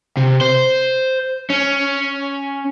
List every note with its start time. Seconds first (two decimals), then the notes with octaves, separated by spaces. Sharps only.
0.17 C3
0.41 C5
1.50 C#4